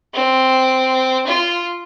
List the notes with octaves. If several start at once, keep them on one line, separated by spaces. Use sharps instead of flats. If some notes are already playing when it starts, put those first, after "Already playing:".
C4
F4